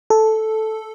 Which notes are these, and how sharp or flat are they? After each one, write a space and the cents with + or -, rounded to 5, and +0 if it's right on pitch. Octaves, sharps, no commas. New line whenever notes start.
A4 -5